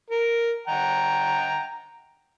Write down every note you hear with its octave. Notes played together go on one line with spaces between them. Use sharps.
A#4
F#5 G5 A#5